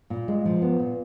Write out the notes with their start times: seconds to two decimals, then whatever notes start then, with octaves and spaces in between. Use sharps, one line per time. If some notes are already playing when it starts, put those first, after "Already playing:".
0.10 A#2
0.28 G#3
0.45 F3
0.62 B3
0.80 A#2